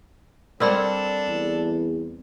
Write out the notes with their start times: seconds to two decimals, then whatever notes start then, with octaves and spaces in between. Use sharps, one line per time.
0.60 G3 C4 D4 A4 A#4 D5 F#5 B5
1.28 E2